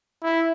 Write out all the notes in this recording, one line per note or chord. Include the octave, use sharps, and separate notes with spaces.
E4